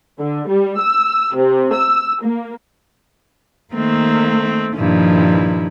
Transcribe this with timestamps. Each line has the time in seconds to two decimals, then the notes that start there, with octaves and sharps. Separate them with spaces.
0.19 D3
0.49 G3
0.79 E6
1.34 C3
1.73 E6
2.23 A#3
3.74 D#3 A3 A#3 C4
4.77 G2 A#2 D#3 F3 E4